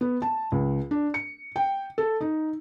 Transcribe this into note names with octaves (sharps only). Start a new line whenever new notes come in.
B3
A5
C#2
D4
C#7
G5
A4
D#4